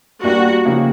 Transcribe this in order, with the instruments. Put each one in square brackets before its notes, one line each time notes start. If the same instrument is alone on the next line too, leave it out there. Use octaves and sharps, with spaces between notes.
[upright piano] G3 A#3 D4 G4 [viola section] F#4
[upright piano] C#3 F3 A#3 D#4 G4